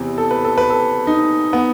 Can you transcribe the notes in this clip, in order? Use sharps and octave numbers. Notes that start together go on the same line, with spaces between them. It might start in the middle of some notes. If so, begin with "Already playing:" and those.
Already playing: E2 C3 E3
A4
B4
A4
B4
A4
D#4
B3